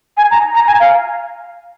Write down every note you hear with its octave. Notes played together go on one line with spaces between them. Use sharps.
G#5
A#5
A#5
G#5
F5